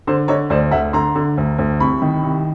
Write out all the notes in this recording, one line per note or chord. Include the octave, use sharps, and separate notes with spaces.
D3 C5
D3 C#5 D#5
D2 C5 D5
D2 E5 F#5
D3 A#5 C6
D3
D2
D2
C2 B5 C#6
D#3
C2